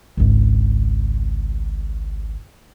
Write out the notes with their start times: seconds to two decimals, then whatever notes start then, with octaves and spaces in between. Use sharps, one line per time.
0.17 G#1 C#2